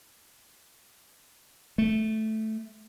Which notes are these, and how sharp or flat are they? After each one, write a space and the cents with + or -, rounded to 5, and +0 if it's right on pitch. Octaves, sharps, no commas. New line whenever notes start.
A3 -5